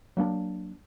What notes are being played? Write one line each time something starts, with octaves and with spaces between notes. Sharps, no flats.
F#3 A#3 B3 D4